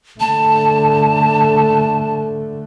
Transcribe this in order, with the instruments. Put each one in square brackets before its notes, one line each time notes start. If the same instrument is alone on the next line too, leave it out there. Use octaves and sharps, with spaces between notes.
[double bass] D3 A3 [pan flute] A5